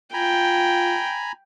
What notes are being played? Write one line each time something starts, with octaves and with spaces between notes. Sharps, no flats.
F4 G5 G#5 A#5 B5